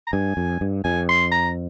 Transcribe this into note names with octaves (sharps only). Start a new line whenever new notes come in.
A#5
G2 G#5
F2
G2
F2 G#5
C6
A#5